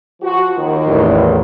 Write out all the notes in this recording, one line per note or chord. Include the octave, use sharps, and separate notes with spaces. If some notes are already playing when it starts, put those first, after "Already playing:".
F3 F#4
D#2 D#3
A1 E2